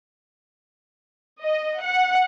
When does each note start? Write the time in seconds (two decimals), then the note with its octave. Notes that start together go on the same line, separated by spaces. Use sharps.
1.42 D#5
1.80 F#5